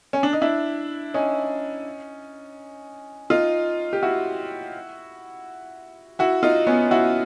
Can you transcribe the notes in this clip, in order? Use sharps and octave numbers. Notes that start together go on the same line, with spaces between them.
C#4
D4
D#4
D4 E4
C#4 D#4
D#4 F4
G4
E4 F#4
E4 F#4
D#4 F4
B3 C#4
E4 F#4